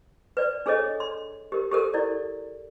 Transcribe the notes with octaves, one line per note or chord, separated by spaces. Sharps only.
B4 D5
D4 G#4 A4 C#5 D#5
C6
G4 A#4
G4 A4 A#4
E4 D5